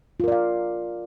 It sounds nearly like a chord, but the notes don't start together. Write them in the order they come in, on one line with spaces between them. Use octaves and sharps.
F4 A#4 D5 F5